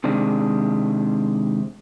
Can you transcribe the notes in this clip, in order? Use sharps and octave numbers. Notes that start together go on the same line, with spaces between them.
C3 D#3 G#3 D4